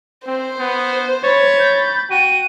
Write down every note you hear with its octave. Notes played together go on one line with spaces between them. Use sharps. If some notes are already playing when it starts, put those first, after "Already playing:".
C4 C5
B3
C#5 B5 A6
G6
F#4 G5 D#7